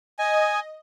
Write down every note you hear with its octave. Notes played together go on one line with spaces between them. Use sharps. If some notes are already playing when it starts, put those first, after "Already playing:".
D#5 G#5